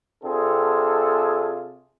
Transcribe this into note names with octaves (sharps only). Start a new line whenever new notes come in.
C3 C4 D4 F4 G#4 A4